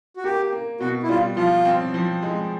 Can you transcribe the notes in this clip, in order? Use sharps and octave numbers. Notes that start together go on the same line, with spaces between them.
F#4
A#3 G4
A#3
B2 F#4
E4
G3 F4
F3 F4
C4
F3
G#3